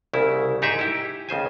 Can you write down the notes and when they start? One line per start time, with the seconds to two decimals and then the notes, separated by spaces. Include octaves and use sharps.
0.13 C2 C#3 E4
0.62 G#2 D#4 G4 G#4 E5
0.79 E4 G4
1.29 C#2 C#3 C5 G#5